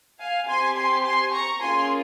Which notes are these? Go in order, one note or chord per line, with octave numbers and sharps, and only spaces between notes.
F5 G#5
C4 G4 G#5 C6
G#5 C6
G#5 C6
A#5 C#6
A#3 C#4 F4 G#4 G#5 C6